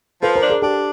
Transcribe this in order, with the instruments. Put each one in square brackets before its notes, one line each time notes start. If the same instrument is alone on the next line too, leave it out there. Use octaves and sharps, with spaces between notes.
[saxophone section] F3 [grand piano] A4 B4
[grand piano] A#4 C5
[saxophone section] D4
[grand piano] G#4 A#4
[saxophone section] D4 [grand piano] G4 A4